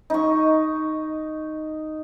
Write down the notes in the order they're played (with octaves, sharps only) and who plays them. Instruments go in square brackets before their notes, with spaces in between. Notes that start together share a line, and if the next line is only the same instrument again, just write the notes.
[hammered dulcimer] D#4 C#6